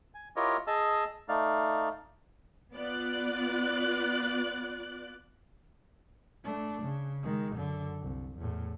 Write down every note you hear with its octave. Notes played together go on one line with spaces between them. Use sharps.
G#5
E4 F4 G4 A#4 C#5 D#5
G#4 D#5 A5 E6
A3 D#4 D5 F5
B3 F4 D5 F#6
A3 D4
C#3
D#3 G#3
F#2 D3
C2
E2 A2